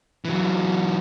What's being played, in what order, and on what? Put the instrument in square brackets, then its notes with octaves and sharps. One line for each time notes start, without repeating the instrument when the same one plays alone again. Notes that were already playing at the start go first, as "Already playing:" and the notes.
[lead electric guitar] E3 F#3